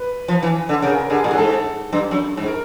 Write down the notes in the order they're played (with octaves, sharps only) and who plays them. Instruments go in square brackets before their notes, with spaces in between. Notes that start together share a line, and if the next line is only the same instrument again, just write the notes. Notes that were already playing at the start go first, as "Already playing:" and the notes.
Already playing: [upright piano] B4
[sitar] F3
E3
D3
[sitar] C#3 [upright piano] A#4
[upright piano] A#4
[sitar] D3 [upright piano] G#4
[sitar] A#2 [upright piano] G#4
[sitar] A2
[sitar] G#2 [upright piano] A4
[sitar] G2
F#2
G#2
[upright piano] A#4